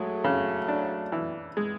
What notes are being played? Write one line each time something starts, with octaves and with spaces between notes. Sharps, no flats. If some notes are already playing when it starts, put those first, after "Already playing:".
Already playing: F#3 G#3 A3
C#3
D4
E3
G#3